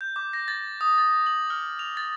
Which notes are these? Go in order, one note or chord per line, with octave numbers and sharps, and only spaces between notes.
G6
D6
A#6
A6
D#6
A6
F#7
F6
F7
A6